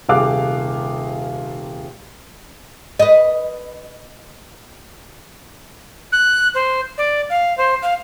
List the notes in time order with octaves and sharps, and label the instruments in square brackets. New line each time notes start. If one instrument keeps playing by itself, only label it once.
[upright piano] D#1 C3 G#4 F5 D6 F#6
[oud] B4 D#5
[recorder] F#6
C5
D5
F5
C5
F5